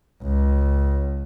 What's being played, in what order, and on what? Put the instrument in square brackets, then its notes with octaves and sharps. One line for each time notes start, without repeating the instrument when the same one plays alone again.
[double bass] C#2